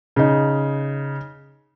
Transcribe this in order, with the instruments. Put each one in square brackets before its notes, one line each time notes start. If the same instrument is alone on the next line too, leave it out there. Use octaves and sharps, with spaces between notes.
[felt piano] C#3 D#4